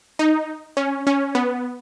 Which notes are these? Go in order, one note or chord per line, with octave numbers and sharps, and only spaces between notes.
D#4
C#4
C#4
B3